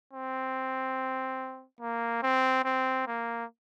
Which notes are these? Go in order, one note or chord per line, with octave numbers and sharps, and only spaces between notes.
C4
A#3
C4
C4
A#3